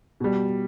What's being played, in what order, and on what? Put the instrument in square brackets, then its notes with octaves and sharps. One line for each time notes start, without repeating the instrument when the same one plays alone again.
[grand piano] B2 G3